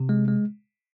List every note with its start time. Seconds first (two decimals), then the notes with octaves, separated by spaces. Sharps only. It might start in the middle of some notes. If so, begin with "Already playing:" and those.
Already playing: C3
0.09 G#3
0.28 G#3